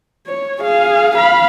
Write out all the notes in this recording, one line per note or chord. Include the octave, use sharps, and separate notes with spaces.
C#5
G#4 F5
F5 B5